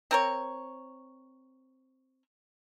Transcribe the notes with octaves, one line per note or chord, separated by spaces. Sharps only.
C4 A#4 C#5